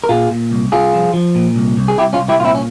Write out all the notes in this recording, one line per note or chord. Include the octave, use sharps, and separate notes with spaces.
A#4
A#2 F4 G#4
A#2
C2
C2 F4 G#4
F3
F3
A#2
C2
C2
G#4
C2 E4 G4
C#4 F4
C2
E4 G4
A#2 F4
C4 E4
C#4